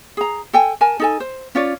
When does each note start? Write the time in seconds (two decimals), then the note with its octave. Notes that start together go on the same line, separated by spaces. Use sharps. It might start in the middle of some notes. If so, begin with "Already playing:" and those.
0.17 G#4 A#5
0.53 A4 G5 G#5
0.81 A#4 G#5 A5
1.00 D#4 A4 G#5
1.20 C5
1.55 C#4 F4 C#5 D5